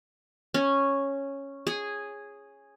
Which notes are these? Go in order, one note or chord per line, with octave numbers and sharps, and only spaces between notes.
C#4
G#4